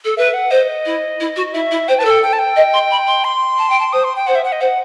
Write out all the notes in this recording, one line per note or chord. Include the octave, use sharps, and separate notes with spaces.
A4
B4 E5
F#5
C5 D#5
E4
E4
F#4
E4 E5
E4
C5 G5
B4 A5
A4
G5
G5
A5
G5
D#5
C6
B5
C6
C6
A5
G5
A5
C5 D#6
C6
G5
C5 F#5
E5
F#5
D#5
C5 F#5